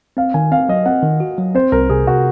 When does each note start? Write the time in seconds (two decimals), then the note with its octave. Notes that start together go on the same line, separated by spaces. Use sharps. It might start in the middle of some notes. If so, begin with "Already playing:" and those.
0.17 C4 F5
0.34 D#3 G#5
0.52 C4 F5
0.69 F#3 D#5
0.86 C4 F#5
1.03 D#3
1.20 F#4
1.38 F#3
1.55 C4 C5
1.72 C2 A#4
1.90 C3 G#4
2.07 C3 F#4